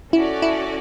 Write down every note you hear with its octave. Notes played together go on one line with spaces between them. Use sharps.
C#4 E4 F#4 A4 D5
E4